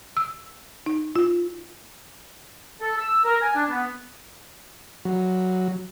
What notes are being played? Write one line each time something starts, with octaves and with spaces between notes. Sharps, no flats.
E6
D#4
F4
A4
E6
A#4
G#5
D4
B3
F#3